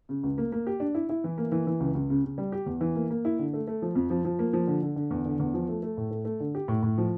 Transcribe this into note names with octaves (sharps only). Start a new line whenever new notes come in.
C#3
C#2
A#3
A#3
G4
D4
E4
E4
E3
A#3
E3
E3
C#2
C#2
C#3
C#3
G3
G4
E2
E3
A#3
A#3
E4
D3
A3
A3
F3
F2
F3
F3
A#3
F3
D3
D3
D3
E2
D3
E2
F3
A3
A3
A2
A3
A3
D3
G4
A2
A2
F3